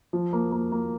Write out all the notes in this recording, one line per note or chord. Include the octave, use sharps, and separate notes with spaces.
F3
A#3
A#3
A#3